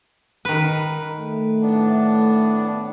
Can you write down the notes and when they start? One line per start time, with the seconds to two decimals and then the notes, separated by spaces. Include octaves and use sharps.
0.45 D#3 B4
1.18 A3
1.62 A2 B3 D4